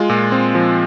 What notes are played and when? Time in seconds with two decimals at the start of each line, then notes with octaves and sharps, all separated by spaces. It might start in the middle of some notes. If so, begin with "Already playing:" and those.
Already playing: G#3 F4
0.09 A#2
0.32 C4
0.55 F3